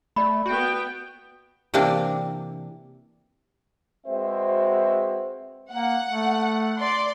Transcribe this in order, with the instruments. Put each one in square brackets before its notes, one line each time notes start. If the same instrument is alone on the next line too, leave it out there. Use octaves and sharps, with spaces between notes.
[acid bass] A3 [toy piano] D5 B5
[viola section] B3 G5 [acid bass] F#4
[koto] C3 E3 A#3 C4 D4
[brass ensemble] G#3 C4 F#4 B4 C5 E5
[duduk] A#3 [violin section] F#5
[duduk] A3
[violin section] D5 C6